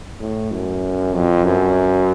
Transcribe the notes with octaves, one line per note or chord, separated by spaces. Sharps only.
A2
F#2
F2
F#2